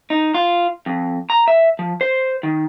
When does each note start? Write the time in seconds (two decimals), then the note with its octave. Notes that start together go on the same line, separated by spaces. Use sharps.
0.10 D#4
0.34 F4
0.86 F2
1.30 A#5
1.48 E5
1.79 F3
2.01 C5
2.43 D#3